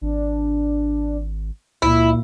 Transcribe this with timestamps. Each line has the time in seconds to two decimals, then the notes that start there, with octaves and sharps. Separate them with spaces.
0.01 G#1 D4
1.82 C#2 A#2 E4